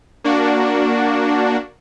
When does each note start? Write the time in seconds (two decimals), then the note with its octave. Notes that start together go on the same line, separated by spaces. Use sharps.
0.24 A#3 D4 F#4